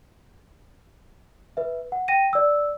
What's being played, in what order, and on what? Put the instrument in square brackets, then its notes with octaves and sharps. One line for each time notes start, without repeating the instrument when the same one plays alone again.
[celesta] B4 E5
F#5
G5 A#6 D#7
D5 E6